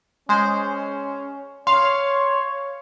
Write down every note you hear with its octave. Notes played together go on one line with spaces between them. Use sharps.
G#3 C#4 C5
C#5 F5 C6